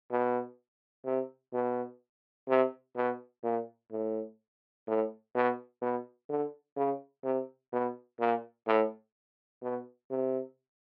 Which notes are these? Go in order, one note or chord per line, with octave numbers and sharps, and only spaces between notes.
B2
C3
B2
C3
B2
A#2
A2
A2
B2
B2
D3
C#3
C3
B2
A#2
A2
B2
C3